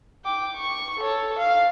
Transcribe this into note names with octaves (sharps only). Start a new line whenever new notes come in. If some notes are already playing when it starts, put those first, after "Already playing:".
G5 D6
C#6
A4 C#5
F5